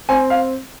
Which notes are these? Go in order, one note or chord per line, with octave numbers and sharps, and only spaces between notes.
C4 G#5
F5